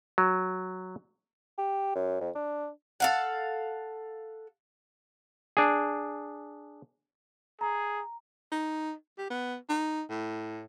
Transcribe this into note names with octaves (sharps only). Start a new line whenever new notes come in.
F#3
G4
F#2
F2
D4
A4 F5 F#5
D4 G#4
G#4 A#5
D#4
G4
B3
D#4
A2